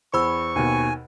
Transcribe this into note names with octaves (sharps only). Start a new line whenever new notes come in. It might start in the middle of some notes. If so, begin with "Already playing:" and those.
E2 C5 B5 C#6 E6
D#2 B2 G#5